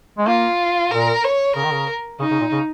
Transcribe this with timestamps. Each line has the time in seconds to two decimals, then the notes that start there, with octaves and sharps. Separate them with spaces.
0.18 G#3
0.27 A#3 F4
0.91 A#2 A#4
1.24 C#5
1.55 C#3 A#4
1.64 D#3
1.71 C#3
2.19 C#3 D#4
2.31 C#3
2.40 A#2
2.51 C#3